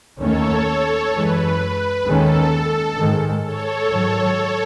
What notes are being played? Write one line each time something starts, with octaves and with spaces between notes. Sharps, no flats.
D#2 D#3 A3 C#4 A4 C#5
F#2 E3 G#3 B4
D#2 D#3 G#3 C#4 A4
G#2 D#3 G#3
A4 C#5
G#2 D#3 F#3